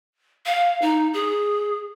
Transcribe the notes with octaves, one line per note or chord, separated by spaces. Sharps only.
F5
D#4
G#4